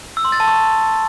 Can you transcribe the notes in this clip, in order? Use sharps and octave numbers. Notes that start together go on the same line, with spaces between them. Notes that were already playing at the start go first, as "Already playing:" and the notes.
E6
C6
A6
A5
C#6